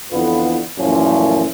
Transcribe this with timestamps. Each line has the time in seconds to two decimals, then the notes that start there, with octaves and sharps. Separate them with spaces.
0.12 F2 D3 E3 B3 F4 B4
0.78 F#2 A#2 E3 F3 A3 C#4